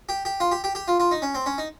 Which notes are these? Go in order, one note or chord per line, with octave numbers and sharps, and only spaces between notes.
G4
G4
F4
G4
G4
G4
F4
F4
D#4
C#4
C4
C#4
D#4